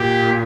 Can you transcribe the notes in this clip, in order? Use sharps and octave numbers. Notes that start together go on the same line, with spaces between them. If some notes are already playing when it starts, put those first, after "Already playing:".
Already playing: A#2 G4